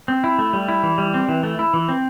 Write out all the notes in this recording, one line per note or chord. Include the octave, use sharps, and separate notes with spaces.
C4
E4
A3
G3
E4
E3
G3
C4
E3
A3
E4
E3
C4